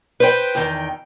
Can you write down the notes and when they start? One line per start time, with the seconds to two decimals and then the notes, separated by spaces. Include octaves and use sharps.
0.20 B4 C5 G5
0.55 E2 D#3 G5